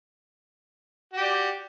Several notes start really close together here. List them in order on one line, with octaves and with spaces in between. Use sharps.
F#4 G4 D5